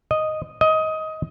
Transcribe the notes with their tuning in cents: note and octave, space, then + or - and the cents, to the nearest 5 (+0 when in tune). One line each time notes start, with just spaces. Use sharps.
D#5 -5
D#5 +15